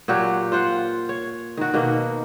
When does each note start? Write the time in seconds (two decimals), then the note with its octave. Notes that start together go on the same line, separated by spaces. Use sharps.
0.08 A#2 F#3 F#4 G4
0.52 F4 C5 F#5
1.09 C#5
1.57 D#3 F#4
1.74 B2 D#3 A#3